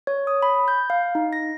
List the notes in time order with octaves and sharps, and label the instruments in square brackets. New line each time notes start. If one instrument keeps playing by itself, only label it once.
[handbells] C#5
D#6
B5
G6
F5
D#4
A#6